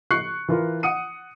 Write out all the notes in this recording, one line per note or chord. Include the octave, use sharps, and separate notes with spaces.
C#6 F#6 C7 C#7
E3 F4 A#4
F#5 D#6 C#7 D#7